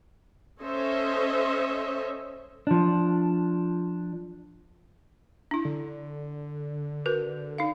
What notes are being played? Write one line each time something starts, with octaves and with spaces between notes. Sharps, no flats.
C#4 A4 C5 C#5 D#5 E5
F3 D4
D4 E4
D3
F#4 A#4 B4
D#4 F5